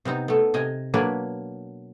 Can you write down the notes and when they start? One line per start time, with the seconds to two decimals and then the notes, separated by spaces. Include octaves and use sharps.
0.05 C3 B3 C4 D#4
0.28 A3 B3
0.54 C3 D#5 G#5
0.94 B2 F#3 A#3 D4 B4 G#5